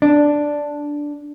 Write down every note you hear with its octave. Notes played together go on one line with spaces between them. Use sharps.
D4